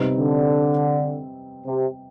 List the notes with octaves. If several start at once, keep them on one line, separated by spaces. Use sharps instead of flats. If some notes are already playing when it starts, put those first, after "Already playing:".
Already playing: C3 G3 C4 D#4 B4
D3
C3